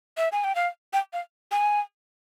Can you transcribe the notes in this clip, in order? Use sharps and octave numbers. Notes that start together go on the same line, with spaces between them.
E5
G#5
G5
F5
G5
F5
G#5